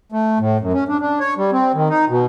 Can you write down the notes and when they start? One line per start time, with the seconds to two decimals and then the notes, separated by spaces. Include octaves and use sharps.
0.12 A3
0.39 A2
0.60 F#2
0.73 C#4
0.88 D4
1.00 D4
1.20 C#5
1.37 G3
1.52 C4
1.74 D#3
1.90 D#4
2.09 B2